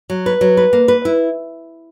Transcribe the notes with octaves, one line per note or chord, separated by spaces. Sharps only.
F#3
B4
F#3
B4
A#3
B4
E4